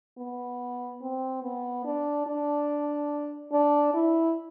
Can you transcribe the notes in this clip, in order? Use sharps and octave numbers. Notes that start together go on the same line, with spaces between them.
B3
C4
B3
D4
D4
D4
E4